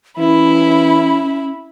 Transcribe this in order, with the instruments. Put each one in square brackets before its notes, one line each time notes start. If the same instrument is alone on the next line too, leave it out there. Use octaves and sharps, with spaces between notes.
[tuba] E3 [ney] C#4 [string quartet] E4 B5